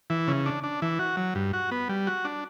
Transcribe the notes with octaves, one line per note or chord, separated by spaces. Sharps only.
E3
C#3
D4
D4
E3
F#4
F#3
G2
F#4
B3
G3
F#4
D4